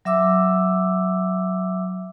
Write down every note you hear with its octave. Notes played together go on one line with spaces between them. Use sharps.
F#3 E5 D6 E6